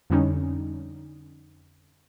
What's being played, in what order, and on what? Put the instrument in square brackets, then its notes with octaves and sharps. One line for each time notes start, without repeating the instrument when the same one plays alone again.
[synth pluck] F2 D3 G3 C#4 D#4